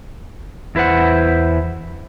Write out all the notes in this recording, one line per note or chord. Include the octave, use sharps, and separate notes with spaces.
E2 E4 B4 C5 F#5